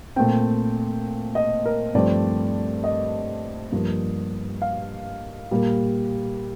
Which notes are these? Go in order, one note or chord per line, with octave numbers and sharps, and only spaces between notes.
A#2 A3 C4 G5
D#5
A#4
G2 F3 A3 C4 D5
D#5
G2 F3 A#3
F5
A#2 G3 A#3